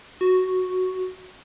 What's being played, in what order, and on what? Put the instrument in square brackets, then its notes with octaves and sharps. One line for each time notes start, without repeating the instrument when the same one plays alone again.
[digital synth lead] F#4